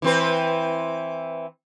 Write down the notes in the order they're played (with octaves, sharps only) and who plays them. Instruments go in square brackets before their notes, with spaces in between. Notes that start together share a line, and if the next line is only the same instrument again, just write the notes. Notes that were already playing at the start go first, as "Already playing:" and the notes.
[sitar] E3 C4 B4